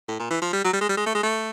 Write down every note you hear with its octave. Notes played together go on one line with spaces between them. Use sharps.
A2
A#2
E3
F3
G3
F#3
G3
G#3
G3
G#3
A3
G#3
A3